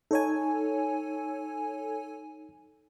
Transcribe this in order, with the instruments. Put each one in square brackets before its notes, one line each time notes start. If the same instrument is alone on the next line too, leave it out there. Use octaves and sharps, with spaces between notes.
[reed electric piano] D#4 [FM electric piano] A4 C#5 G#5